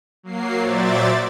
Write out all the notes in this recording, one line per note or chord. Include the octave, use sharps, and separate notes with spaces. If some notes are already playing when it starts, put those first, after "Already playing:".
F#3 A#3 C7
A#2 F#3 C5 D5 E5 A6